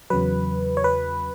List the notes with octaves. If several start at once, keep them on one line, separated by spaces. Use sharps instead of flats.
E2 C#3 F#3 B4
C#5
B4